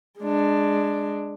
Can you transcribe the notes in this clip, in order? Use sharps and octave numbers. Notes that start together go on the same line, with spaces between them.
G#3 D4